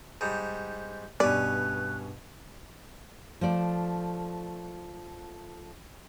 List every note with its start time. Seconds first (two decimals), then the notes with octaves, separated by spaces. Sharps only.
0.21 G#2 G3
1.20 G2 B2 G3 C#4 B4 D5 F#6
3.41 F3 A3 D5